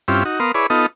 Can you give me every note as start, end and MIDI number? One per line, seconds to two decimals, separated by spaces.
0.08 0.23 43
0.08 0.23 60
0.08 0.23 61
0.08 0.23 64
0.08 0.23 65
0.08 0.23 67
0.25 0.39 63
0.25 0.39 66
0.40 0.52 59
0.40 0.52 70
0.40 0.52 77
0.40 0.52 84
0.40 0.52 87
0.55 0.67 64
0.55 0.67 68
0.55 0.67 71
0.55 0.67 73
0.55 0.67 74
0.70 0.86 59
0.70 0.86 63
0.70 0.86 65
0.70 0.86 69
0.70 0.86 75